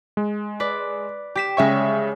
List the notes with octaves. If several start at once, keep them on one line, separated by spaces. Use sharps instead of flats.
G#3
B4 D5
G4 B6 E7
C#3 G#3 C#5 E5 C#6